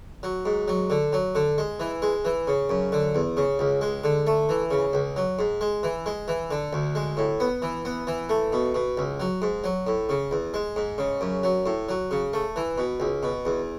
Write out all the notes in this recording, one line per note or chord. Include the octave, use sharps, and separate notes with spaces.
F#3
G#2
F#3
D3
F#3
D3
G#3
E3
G#3
E3
C#3
F#2
D3
E2
C#3
C#2
G#3
D3
A3
E3
C#3
C#2
F#3
G#2
G#3
E3
G#3
E3
D3
D2
G#3
A2
B3
E3
B3
E3
A3
B2
B2
C#2
F#3
G#2
F#3
A2
C#3
E2
G#3
G#2
C#3
F#2
F#3
A2
F#3
C#3
A3
E3
B2
C#2
B2
E2